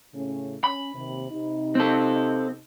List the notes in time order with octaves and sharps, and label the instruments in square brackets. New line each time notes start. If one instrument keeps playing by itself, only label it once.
[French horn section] A2 C#3 C#4
[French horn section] C#4 [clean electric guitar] B5
[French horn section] D#2 C3
C3 D#4
[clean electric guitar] C4 A4